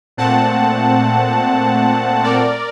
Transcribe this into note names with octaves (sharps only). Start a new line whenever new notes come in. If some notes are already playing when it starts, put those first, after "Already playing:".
A#2 A3 C4 F#5 A5
A#4 D5